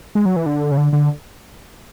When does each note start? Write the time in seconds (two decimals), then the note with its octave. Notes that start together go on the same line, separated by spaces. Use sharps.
0.15 G#3
0.26 F#3
0.36 E3
0.46 D3
0.71 C#3
0.77 D3
0.93 D3